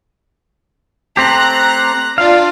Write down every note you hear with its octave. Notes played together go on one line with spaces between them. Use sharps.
A3 C4 G4 A#5 F#6
D4 F4 D5 F5